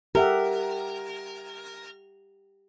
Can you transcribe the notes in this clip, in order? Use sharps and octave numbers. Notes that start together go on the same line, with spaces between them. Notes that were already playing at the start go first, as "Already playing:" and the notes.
G4 A#4 E5 F#5